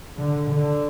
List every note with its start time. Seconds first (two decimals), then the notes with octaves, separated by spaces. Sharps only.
0.19 D3
0.50 D3